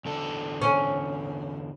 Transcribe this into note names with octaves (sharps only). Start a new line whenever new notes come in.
E2 D3 A4
C#4